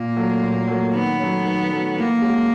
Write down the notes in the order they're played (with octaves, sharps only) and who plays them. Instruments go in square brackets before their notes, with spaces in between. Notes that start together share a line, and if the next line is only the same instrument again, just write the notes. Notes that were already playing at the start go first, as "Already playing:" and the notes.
Already playing: [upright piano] A#2 [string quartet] A#3
[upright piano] F#3 A3
A#2
F#3 A3
[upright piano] D#3 [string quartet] B3
[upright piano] F#3 A3 C#4
D#3
F#3 A3 C#4
[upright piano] E3 [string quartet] A#3
[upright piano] G#3 C#4 F#4